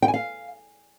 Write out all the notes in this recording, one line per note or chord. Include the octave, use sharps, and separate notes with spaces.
G5
G#5
F5